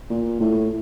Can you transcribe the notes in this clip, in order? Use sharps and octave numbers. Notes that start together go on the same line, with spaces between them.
A#2
A2